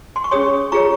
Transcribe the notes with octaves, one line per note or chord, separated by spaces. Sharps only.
C6
C#6
C#4 G#4 C#5 C6 D#6
F4 G#4 C#5 A#5 C#6